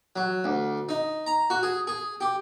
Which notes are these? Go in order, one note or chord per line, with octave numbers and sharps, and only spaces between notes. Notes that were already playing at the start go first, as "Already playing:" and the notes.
F#3
D2
D#4
A#5
F#4
G#4
G#4
G4